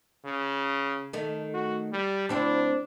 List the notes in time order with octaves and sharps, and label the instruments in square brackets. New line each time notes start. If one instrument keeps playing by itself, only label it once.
[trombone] C#3
[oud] D#3 A3
[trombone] F#4
G3
[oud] D2 C4 E4 [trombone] D4